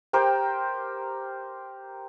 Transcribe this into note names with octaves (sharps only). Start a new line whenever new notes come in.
G4 A#4 C5 G5